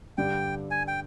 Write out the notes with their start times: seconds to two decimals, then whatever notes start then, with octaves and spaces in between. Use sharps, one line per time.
0.18 G2 D3 G3 G5
0.71 G#5
0.88 G5